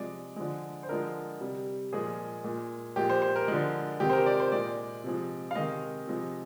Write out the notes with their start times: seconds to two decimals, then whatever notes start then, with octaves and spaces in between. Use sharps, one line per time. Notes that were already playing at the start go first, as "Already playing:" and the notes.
Already playing: C3 F3 G#3 D5
0.36 D3 F3 G#3
0.83 C5
0.89 D3 F3 G#3 A#4
1.41 C3 G3
1.92 A#2 F3 G#3 G#4
2.44 A#2 G#3
2.96 A#2 F3 G#3 G4
3.09 C5
3.22 C5
3.36 A#4
3.48 D3 F3 G#3
4.00 C3 D#3 G#3 G4
4.10 C5
4.13 A#4
4.26 D5
4.40 C5
4.52 A#2 G#3 D5
5.04 C3 F3 G#3
5.51 F5
5.55 C3 D#3 G#3 D#5
6.07 C3 F3 G#3